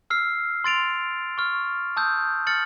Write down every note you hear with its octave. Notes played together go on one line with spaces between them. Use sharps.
E6 F6 C7
C6 A6 D7 F7
C#6 F6
A5 D#6 E6 G6
F6 A6 C#7 F#7